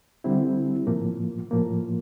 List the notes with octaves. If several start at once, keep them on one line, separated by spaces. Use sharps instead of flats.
D3 G3 C4 E4
A2 F3 A#3
A2 F3 A#3